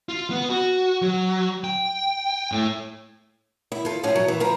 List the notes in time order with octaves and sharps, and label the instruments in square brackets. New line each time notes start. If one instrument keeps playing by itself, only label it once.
[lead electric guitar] F4
B3
F#4
F#3
G5
A2
[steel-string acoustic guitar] E4
F4 A4
A2 F3 A3 C#4
F#3
E3
F3 A#4 B4